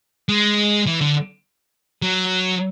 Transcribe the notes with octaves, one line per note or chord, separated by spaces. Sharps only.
G#3
E3
D3
F#3